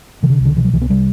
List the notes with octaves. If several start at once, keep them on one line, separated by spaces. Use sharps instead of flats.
C3 E3
D3
C2
D3
B2 E3
F#3
C2 E3
B3
C3 G3